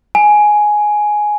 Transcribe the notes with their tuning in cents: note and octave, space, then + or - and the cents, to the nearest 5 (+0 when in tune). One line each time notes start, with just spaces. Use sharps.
G#5 +10